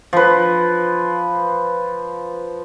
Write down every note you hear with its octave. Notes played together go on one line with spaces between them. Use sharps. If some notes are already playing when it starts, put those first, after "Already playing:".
F3 B4